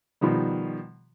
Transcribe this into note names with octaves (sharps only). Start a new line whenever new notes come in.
B2 D#3 F3 G3